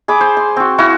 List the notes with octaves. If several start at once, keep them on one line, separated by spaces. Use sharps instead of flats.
G#4 B5 D6
C5
C6
C4 F#4
E4 F#4 F5